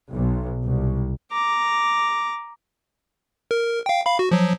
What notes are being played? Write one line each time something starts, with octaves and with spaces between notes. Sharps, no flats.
B1
C2
A#5 D6
A#4
F5 G5
F5 B5
F#4
F3 F#3